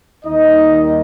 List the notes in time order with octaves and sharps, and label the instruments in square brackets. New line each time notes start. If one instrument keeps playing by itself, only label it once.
[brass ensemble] D#2 D#3 G3 D#4 D#5